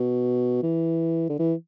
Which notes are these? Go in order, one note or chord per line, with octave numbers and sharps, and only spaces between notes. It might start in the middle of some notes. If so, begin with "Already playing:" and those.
Already playing: B2
E3
D3
E3